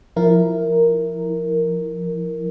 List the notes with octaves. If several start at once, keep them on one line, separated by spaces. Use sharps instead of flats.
F3 E4 A#4